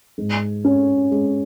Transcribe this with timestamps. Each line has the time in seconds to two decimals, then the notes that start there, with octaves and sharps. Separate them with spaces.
0.18 G#2
0.64 C#4
1.11 G#3